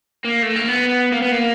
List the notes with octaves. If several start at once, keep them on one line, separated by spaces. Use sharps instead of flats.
A#3
A3
A#3
B3
A#3
B3
A#3